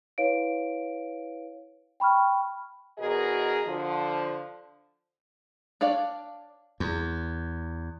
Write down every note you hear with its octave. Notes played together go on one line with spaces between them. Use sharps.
E4 B4 C#5 F5 D7
G5 B5 C#6 F6
E2 B2 F#4 G#4 A#4 D#5
D3 F3
D4 C#5 D5 F5
E2